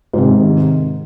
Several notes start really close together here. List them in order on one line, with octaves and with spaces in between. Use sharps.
G#2 C3 D#3